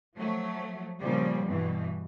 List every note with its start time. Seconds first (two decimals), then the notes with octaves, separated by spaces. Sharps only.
0.16 F3 F#3 A3
1.00 A#2 C#3 F3 G3
1.45 G2 B2 E3